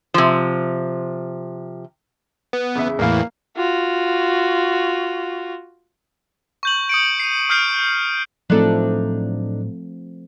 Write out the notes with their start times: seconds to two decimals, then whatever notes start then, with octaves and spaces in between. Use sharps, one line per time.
0.14 C3 F3
2.53 B3
2.75 E2 C#3 E5
2.99 E2 A2 E3 A#3 F5
3.56 F4 F#4
6.63 C#6 G6 F#7
6.89 D#6 C#7 D7
7.20 C7 D#7
7.49 D#6 F6 G6 C7 D7
8.50 A2 F3 F#3 A3 C4 D4 D#4 A4